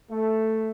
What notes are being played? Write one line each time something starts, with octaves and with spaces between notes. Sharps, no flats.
A3